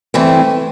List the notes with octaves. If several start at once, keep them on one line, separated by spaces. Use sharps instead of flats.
G2 E3 A3 C4 E4